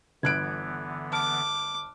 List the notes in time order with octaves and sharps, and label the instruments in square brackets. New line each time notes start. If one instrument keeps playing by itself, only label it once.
[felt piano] G1 F#6 D7 [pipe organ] D3 E3 B3 [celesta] G#6
[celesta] A5 F6 [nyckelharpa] D6